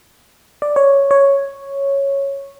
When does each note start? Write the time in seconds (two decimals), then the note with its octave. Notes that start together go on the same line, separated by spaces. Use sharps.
0.62 D5
0.76 C#5
1.11 C#5